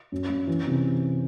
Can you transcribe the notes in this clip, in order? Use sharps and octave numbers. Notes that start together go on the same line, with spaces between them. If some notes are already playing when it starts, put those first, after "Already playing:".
F#2
F#2
E3
C3